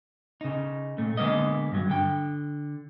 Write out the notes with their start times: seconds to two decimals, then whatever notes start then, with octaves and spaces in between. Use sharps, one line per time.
0.41 C#3 D#4
0.98 A#2 A3
1.17 D3 G#3 A#3 B3 D#5
1.72 G2 F#3
1.90 D3 G5